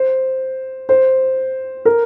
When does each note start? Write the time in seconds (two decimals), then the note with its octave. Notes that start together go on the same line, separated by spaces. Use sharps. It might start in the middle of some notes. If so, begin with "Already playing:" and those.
Already playing: C5
0.89 C5
1.85 A#4